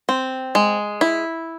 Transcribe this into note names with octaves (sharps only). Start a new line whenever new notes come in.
C4
G#3
E4